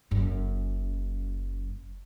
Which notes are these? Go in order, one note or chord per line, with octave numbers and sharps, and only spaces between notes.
F#1 F#2